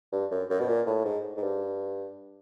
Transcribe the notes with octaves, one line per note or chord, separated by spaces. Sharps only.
G2
F#2
F#2
B2
A#2
A2
G#2
G#2
G2